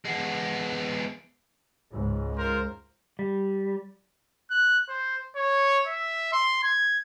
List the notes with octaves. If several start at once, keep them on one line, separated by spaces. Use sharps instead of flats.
G#3 B3
C#2 G#2
F4 A#4 C5
G3
F#6
C5
C#5
E5
C6
G#6